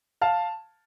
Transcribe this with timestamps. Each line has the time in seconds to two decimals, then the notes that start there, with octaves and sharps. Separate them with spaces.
0.21 F5 A5